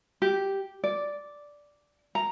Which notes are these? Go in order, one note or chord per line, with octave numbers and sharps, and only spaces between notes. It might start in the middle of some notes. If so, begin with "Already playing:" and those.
G4
D5
A#5